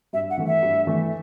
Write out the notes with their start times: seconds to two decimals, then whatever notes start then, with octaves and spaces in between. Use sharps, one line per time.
0.13 G2 E5
0.30 F#5
0.38 E3 A3
0.47 E5
0.62 G2
0.87 E3 A3